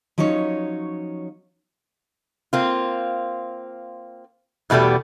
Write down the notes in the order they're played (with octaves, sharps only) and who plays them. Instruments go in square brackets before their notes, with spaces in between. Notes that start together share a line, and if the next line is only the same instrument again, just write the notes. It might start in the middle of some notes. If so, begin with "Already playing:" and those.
[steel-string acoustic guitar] F3 F#3 C#4 D#4 C#5
[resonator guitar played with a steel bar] A#3 C4 F4
E2 B2 G3 A3 G4